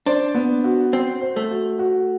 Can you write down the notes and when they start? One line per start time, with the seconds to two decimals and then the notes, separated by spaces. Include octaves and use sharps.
0.06 D4 C5
0.35 B3
0.64 F#4
0.93 C4 C5
1.21 C5
1.36 A3
1.51 F#4
1.79 F#4